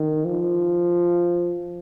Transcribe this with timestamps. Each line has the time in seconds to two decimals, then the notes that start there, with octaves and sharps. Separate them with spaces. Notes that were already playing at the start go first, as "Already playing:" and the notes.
Already playing: D#3
0.25 F3